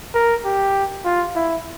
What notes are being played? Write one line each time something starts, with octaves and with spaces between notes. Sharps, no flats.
A#4
G4
F4
E4